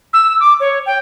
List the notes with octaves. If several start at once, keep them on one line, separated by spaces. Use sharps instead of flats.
E6
D6
C#5
G5